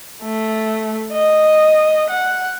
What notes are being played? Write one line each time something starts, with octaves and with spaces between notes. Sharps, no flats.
A3
D#5
F#5